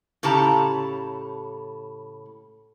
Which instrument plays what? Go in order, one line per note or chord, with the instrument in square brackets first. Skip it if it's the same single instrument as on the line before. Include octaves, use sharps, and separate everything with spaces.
[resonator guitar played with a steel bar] A2 C#3 G4 A4 A5 A#5